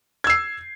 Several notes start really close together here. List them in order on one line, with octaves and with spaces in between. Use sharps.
G#6 E6 C7